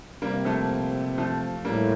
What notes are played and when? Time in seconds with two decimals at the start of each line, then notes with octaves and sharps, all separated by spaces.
0.22 C3 G3 A#3
0.45 F3 A3
1.18 F3 A3
1.65 A2 G3 A#3